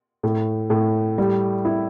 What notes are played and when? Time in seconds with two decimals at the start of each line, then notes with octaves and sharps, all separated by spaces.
0.23 A2
0.70 A2
1.18 G3
1.65 E4